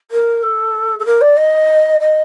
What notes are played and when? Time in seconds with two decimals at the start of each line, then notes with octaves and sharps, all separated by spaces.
0.11 A#4
0.42 A4
0.99 A4
1.05 A#4
1.21 D5
1.36 D#5
2.00 D#5